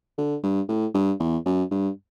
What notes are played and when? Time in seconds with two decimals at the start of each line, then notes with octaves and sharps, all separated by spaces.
0.18 D3
0.44 G2
0.68 A2
0.94 G2
1.20 E2
1.46 F#2
1.71 G2